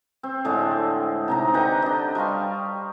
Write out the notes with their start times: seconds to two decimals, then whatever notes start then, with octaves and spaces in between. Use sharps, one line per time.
0.23 C4
0.45 A2 D3 G#3 D4
1.28 C3 D#4 A#5
1.54 D3 B4 G5 A#5
1.82 D4 D#5
2.15 G3 F5 C6 C#6